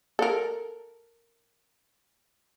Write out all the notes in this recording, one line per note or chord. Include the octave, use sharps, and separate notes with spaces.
A4 A#4